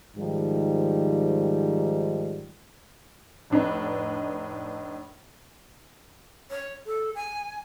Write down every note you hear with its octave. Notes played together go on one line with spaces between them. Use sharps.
G#2 D#3 F3 G3
F1 A2 D4 D#4 B4
C#5
A4
G#5